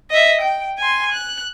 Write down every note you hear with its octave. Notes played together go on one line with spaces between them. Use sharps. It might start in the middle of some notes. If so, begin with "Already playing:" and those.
D#5 E5
G5
G#5 C6
F#6